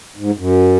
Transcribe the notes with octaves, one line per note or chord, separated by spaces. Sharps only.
G#2
F#2